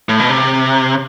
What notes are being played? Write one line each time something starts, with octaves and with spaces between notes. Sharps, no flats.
A2
B2
C3